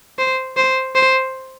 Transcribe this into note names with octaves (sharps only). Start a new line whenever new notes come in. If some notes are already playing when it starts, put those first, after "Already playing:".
C5
C5
C5